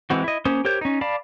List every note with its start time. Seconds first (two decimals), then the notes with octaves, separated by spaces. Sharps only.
0.10 E3 G#3 C4 F#4
0.24 E4 D#5
0.45 A#3 C#4 C5 D#6
0.65 G4 A#4 C5 C#5 G6
0.81 C#4 D#4
1.01 D5 F5 A5 B5